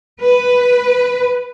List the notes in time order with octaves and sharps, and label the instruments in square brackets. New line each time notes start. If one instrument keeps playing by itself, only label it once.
[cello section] B4